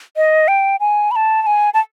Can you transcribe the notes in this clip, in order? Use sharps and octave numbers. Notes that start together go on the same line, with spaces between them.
D#5
G5
G#5
B5
A5
A5
G#5
A5